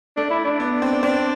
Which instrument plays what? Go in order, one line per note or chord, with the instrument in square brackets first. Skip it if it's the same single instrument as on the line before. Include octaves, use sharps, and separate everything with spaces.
[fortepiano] A3 [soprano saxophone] D4
[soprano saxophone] E4
D4
[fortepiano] B3
C4
[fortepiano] C4 [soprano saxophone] D4